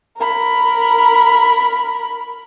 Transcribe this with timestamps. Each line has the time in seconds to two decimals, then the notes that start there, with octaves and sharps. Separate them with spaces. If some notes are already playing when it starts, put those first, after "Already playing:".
0.17 A#4 B5